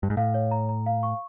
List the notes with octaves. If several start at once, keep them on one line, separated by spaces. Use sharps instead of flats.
G2
G#2
A2 F5
C#5
A#5
A#5
F5
C#6